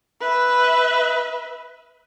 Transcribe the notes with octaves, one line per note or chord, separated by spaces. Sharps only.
B4 E5